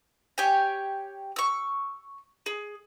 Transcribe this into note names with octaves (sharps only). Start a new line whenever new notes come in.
G4 C#5 G5 G#5
C#6 E6
G#4